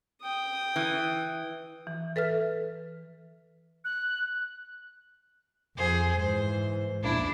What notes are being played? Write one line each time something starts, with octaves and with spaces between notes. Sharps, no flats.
G5 D#6
E3
E3
A4 B4 E5 F6
F#6
F2 G#4 C5
G#2 E3 C5
A#1 E2 D4 E4